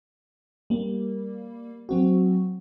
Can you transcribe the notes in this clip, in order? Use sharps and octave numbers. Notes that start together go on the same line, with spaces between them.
G3 A#3
F#3 C4 F#4